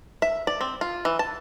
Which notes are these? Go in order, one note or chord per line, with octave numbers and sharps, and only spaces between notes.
E5
D5
C4
F4
E3
A5